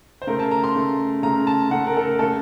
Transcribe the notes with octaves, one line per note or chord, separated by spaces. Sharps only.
C5
C#3 A3 A#4
A5
A#5
C6
C#3 A3
C#3 A3 A#5
A5
C#3 A3 F#5
A#4
A4
A#4
C#3 A3 A4